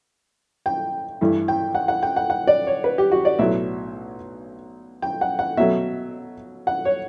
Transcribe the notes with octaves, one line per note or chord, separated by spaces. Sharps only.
G5
G2 E3 A3 E4
G5
F#5
F#5
G5
F#5
F#5
D5
C#5
B4
G4
F#4
D5
B1 A2 F#3 A3 E5
G5
F#5
F#5
B2 F#3 A3 E5
F#5
C#5